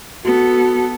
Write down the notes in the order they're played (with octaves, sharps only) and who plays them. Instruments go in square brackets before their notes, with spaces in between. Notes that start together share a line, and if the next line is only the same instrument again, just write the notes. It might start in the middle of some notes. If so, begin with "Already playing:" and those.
[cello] B3 A4 [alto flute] F#4